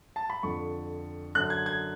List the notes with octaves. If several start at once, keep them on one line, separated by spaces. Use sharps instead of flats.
A5
B5
F2 D3 C#6
F#2 D3 F#6
G#6
G#6